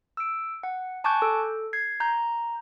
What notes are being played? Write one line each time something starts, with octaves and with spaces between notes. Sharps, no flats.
E6 D7
F#5
G#5 A5 C#6 D6 F#6 G6
A4
G#6 C7
A#5 G6